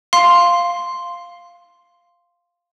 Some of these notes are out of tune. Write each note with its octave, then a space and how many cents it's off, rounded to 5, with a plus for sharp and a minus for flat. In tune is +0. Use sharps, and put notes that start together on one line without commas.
F5 +0 C6 +0